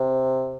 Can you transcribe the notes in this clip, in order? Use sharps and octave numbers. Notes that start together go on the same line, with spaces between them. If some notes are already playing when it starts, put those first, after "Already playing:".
Already playing: C3